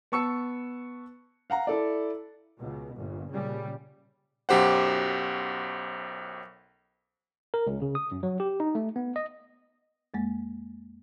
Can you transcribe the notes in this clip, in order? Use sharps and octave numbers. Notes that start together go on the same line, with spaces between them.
B3 A5 C#6 E6 C#7
F5 F#5 A#5
E4 A4 D5
C#2 B2
G1 A#2
A#2 C#3 G3
B1 F#2 G4 C5 F#5
A#4
C#2
C#3
D#6
F#2
F#3
G4
D#4
A3
B3
D#5
F2 G#3 A#3